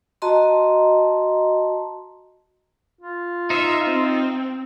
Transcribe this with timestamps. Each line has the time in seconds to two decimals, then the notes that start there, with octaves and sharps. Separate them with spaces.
0.22 F#4 D#5 A5 A#5 C6
3.01 F4
3.50 D#4 C5 E5
3.86 C4